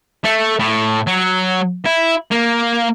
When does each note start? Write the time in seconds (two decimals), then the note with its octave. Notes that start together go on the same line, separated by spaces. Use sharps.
0.24 A3
0.59 A2
1.07 F#3
1.85 E4
2.31 A#3